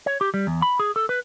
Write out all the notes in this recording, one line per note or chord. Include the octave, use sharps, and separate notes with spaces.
C#5
G4
G3
E2
B5
G#4
A4
B4